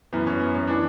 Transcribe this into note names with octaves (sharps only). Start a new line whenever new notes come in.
F#2 E3 B3
C#4
B3
C#4
E3 D4